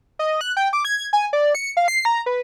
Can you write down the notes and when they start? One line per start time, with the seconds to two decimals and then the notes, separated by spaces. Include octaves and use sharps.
0.19 D#5
0.41 F#6
0.57 G5
0.73 D6
0.85 G#6
1.13 G#5
1.33 D5
1.55 C#7
1.77 F5
1.88 C7
2.05 A#5
2.26 B4